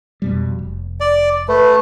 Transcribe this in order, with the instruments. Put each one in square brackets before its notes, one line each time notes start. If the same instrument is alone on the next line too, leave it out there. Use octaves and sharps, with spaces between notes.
[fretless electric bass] F2 B2 G3
F1
[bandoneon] D5
[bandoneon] A3 [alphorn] B4